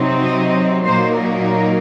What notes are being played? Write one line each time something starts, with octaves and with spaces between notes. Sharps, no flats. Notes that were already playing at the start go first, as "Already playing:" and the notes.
Already playing: C3 F#3 C4 D#4
D#5
A#2 F#3 A#3 D#4 C5
A#4